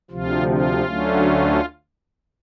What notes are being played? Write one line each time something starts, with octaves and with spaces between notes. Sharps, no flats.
D2 C3 F3 F4
F4
D2 D3 F#3 A3 C#4